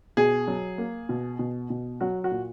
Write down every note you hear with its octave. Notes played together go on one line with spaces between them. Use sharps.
B2 G#4
F#3
A#3
B2
B2
B2
F#3 F#4
F#4
A#2